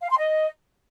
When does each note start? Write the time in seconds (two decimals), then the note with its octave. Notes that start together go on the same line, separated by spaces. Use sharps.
0.03 F5
0.10 C6
0.18 D#5